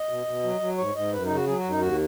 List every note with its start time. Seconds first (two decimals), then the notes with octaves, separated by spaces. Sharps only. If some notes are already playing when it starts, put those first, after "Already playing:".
Already playing: D#5
0.09 B2
0.26 B2
0.43 F#3
0.61 F#3
0.78 G#2 C#5
0.95 G#2 D#5
1.13 F#2 B4
1.25 C#3 D#4
1.35 F#4
1.46 F#3 G#4
1.59 F#4
1.64 F#2
1.70 D#4
1.81 D#2 F#4